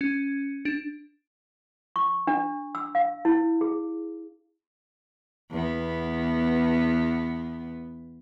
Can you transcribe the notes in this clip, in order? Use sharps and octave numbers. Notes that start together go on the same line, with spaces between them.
C#4
D4
C#6
D4
E6
F5
E4
G#4
E2 B3